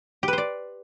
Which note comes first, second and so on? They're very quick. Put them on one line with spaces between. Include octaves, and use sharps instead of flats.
G4 B4 C5 D5